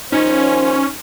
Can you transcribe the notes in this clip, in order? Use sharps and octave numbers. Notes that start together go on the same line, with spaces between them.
D#2 F3 C#4 D#4 C5